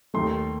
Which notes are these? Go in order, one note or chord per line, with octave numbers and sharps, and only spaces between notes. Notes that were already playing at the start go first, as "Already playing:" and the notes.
D#2 D#3 A3 C6